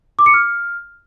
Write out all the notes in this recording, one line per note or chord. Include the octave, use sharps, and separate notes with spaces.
D6
C#7
F6